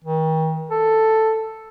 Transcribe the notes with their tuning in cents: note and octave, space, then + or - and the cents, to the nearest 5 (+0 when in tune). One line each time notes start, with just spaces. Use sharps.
D#3 +40
A4 +5